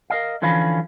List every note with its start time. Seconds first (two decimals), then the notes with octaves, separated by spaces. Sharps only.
0.10 A#4 D#5 F5
0.42 D3 E3 F3 C#4 F5 B5